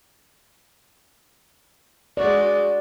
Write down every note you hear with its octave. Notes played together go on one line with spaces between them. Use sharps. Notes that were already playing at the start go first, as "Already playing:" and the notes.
G#3 F#4 D5